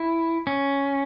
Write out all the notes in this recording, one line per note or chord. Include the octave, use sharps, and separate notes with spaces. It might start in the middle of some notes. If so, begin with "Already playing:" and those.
Already playing: E4
C#4